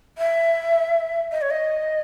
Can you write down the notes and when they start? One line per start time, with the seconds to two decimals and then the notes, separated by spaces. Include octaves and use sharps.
0.18 E5
1.31 D#5
1.41 C#5
1.50 D#5